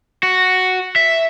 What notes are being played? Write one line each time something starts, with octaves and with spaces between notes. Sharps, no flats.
F#4
E5